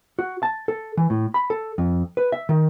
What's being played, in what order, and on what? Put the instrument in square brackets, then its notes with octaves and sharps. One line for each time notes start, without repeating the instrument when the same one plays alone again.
[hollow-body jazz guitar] F#4
A5
A4
E3
A2
B5
A4
F2
B4
E5
D#3